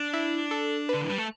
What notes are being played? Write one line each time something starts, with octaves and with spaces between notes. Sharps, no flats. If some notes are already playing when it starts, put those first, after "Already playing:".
Already playing: D4
E4
A4
D3 B4
E3
G3
A3